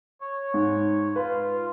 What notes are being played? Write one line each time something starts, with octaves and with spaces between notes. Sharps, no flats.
C#5
G#2
F4 B4